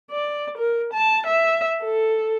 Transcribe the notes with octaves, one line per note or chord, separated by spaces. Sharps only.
D5
A#4
A5
E5
A4